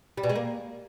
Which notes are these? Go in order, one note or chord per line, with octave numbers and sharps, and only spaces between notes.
G3
B2
G#3
A#3